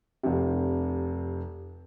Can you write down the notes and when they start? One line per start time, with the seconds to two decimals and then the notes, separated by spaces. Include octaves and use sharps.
0.23 F1 C3